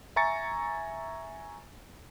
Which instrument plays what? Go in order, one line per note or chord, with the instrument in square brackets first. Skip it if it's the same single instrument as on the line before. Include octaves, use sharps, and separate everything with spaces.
[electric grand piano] E5 G#5 A#5 C#6 A6 C#7